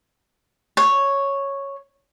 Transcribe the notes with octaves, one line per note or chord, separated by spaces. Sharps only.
C#5